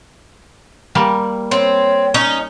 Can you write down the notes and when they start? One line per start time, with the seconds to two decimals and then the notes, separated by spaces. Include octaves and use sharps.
0.95 G3 A#3
1.51 C4 C#5
2.14 C#4 D#4